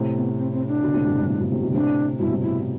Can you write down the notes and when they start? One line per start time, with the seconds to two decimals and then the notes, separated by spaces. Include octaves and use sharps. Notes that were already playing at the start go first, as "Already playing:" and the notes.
Already playing: A2 C3
0.14 B3
0.37 C4
0.52 C4
0.67 D4
0.83 B2 D3
0.94 A2 C3
1.06 G2 B2
1.19 G2
1.28 A2
1.40 G2 B2
1.52 A2 C3
1.62 B2 D3
1.74 A2 C3 D4
2.19 G2 B2 E4
2.31 A2 C3
2.42 E4